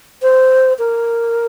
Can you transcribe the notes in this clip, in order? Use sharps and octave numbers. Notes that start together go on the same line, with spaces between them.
C5
A#4